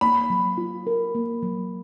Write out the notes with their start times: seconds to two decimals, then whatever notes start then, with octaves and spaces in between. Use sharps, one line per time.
0.01 A#3 B5
0.30 F#3
0.58 F4
0.87 A#4
1.15 A#3
1.42 F#3